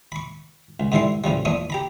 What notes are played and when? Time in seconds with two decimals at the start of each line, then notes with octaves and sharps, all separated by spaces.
0.12 B5 C#6
0.80 C#2
0.92 G#2 D3 E3 G3 E4 C6
1.24 A2 C#3 F3 G3
1.45 A#1 E2 A#2 D4 C#6 D#6
1.70 G4 A#5 B5